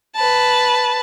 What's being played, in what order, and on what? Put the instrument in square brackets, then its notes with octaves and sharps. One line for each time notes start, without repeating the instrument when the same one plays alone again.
[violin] B4 A5